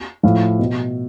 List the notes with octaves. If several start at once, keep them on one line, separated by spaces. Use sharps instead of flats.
A2 F3 F5
B2